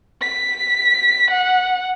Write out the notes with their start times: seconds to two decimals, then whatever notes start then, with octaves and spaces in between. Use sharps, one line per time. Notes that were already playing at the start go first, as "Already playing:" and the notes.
0.21 B6
1.31 F#5